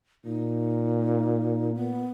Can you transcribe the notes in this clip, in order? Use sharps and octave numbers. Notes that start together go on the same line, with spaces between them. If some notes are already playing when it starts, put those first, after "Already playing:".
A#2 D#4
B3